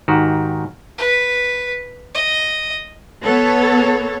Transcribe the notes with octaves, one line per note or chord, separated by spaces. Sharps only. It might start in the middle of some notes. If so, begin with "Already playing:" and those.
G#2 D#3 F#4 G4
B4
D#5
B3 A4 C#5